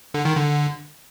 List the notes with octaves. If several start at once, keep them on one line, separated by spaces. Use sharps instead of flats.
D3
D#3
D3